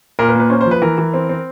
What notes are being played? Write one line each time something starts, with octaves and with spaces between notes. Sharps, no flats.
A#2 A#4
B4
A#3
B4
C#4 C5
C5
F3
B4
E3 A#4
E3
C4
C4